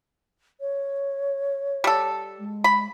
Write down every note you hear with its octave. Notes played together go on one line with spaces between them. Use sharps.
C#5
G3 A4
G#3
B5